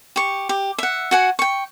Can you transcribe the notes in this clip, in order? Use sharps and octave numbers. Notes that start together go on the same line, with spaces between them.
G4 C#6
G4
E5 F#5
F#4 F#5 G#5
G5 C#6